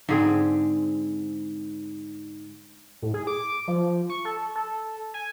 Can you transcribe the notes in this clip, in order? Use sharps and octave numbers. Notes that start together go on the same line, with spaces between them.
G#2 D3 C4 G#4
A2
G#4
D6
F3
C#6
A4
A4
G#5